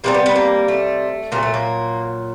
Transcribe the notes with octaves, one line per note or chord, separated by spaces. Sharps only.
C3 E3 G3 A#3
B3
B3
A#3
A3
A#2 F#3 A3 A#3
A3
A#3